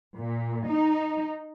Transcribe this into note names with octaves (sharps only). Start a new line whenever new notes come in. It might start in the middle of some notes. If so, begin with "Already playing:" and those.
A#2
D#4